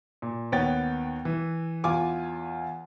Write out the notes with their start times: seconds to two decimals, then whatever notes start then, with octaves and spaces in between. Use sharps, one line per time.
0.22 A#2
0.52 D#2 B3 C#5 G5 A6
1.25 E3
1.84 E2 F4 G#5 D6